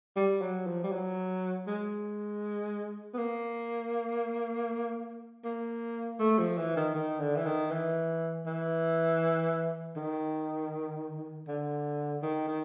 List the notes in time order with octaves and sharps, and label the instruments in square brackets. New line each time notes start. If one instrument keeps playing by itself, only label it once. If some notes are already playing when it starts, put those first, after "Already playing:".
[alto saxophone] G3
F#3
F3
G3
F#3
G#3
B3
A#3
A#3
A3
F3
E3
D#3
D#3
D3
E3
D#3
E3
E3
D#3
D3
D#3
D#3